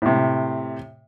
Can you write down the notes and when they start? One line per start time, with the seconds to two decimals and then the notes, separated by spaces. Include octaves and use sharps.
0.02 A2 C3